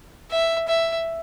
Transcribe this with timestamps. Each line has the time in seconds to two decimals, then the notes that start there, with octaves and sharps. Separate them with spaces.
0.31 E5
0.68 E5